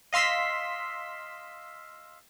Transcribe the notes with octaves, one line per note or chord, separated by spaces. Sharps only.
D#5 F5 C6 E6 B6